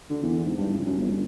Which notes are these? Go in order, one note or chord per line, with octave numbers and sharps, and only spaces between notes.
D3
E2
G#2
G2
C#2
F#2
G1
G1